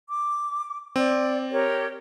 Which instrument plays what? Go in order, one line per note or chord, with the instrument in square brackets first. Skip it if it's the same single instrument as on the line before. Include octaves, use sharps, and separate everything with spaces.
[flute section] D6
[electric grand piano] C4 [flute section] D5
[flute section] G4 A#4 C#5